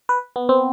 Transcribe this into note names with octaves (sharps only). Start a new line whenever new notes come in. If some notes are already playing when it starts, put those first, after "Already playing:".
B4
B3
C4